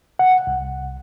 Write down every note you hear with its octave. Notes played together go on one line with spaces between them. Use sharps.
F#5
C2